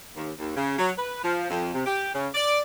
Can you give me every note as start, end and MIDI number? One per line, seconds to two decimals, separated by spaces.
0.16 0.30 39
0.39 0.54 39
0.56 0.76 49
0.78 0.91 54
0.98 1.21 71
1.24 1.46 53
1.50 1.73 41
1.74 1.83 48
1.86 2.11 67
2.14 2.28 49
2.34 2.60 74